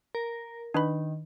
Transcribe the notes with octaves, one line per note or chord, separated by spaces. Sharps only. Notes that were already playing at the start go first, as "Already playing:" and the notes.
A#4
D#3 D4 B4 B5